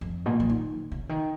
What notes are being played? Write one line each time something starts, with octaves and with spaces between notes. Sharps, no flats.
F2
A#2
F3
D#3
C#3
D#3